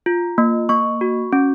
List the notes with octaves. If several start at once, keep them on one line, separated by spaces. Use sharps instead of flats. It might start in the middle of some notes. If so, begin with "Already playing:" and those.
F4
A#3
A#3 C#6
F#4
C#4